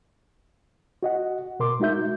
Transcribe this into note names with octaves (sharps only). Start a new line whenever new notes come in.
F#4 D#5 F#5
B2 A#4 C6 D6
G#3 D#4 F#4 E5 G6